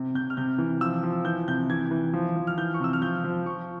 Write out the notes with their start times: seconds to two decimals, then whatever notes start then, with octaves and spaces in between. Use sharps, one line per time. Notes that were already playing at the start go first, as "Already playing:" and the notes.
Already playing: C3
0.15 C3 G6
0.30 F6
0.37 C3 G6
0.58 E3
0.81 F3 E6
1.03 F3
1.25 E3 G6
1.48 C3 G6
1.70 E3 G#6
1.91 E3
2.13 F3
2.36 F3
2.47 F6
2.57 E3 G6
2.74 C#6
2.80 C3 E6
2.93 F6
3.01 F3 G6
3.24 F3
3.46 F3 C#6